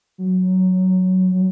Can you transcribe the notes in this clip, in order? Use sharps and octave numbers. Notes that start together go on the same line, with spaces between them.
F#3
F#3